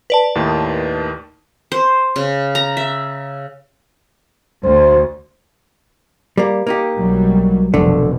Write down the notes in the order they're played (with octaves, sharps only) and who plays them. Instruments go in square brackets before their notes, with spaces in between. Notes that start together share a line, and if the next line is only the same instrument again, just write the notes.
[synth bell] B4 D5 A5
[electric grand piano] D#2 A2 D#3
[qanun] C5
C#3
A#5
E5
[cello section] D2 [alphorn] C5
[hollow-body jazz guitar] G3 A#3
A#3 D#4 G4
[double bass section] B1 F#3 G3
[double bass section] F1 B2 [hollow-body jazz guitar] D3 A3